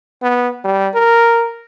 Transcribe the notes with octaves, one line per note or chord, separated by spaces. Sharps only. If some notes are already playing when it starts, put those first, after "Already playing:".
B3
G3
A#4